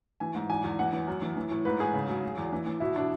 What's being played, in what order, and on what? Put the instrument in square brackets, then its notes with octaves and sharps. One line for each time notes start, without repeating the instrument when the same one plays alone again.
[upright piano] E3 G#5
G#2
E2 G#5
E2
E3 F#5
E3
F#2
E3
E3
A2
G#2 B4
G#2 G#4
C#3
F#3
F#3
E2
E3
E3
B2 E4
B2 D4